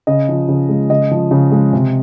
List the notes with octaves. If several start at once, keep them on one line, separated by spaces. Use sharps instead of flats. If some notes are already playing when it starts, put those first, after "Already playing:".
C#3 D#5
F3
C#3
G#3
C#3 D#5
F3
C#3
G#3
C3